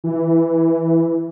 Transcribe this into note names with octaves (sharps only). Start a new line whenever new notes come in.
E3